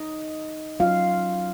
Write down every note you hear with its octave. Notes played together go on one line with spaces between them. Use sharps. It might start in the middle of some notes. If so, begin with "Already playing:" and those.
Already playing: D#4 D#5
F#3 C#4 F4 F5